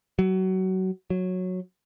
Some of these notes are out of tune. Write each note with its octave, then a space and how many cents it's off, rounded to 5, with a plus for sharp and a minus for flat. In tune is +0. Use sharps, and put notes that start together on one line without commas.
F#3 +25
F#3 -10